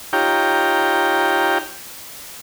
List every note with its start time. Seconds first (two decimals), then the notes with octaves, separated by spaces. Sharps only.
0.13 D#4 F4 G4 C#5 G5 A#5